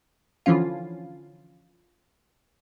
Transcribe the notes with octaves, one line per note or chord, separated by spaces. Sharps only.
D3 E3 F3 C#4 F4